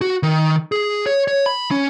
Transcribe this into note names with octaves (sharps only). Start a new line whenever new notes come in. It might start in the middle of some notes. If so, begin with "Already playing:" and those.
F#4
D#3
G#4
C#5
C#5
B5
C#4